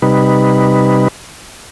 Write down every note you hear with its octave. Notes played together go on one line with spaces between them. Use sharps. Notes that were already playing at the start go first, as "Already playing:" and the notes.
C3 G3 D#4 B4